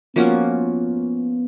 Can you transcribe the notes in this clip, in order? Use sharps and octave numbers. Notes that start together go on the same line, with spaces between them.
F3 A#3 B3 C#4 F#4